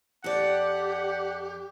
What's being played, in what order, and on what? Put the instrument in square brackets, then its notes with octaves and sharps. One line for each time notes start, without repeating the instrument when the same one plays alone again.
[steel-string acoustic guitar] F2 D5 [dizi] G4 [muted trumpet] F#5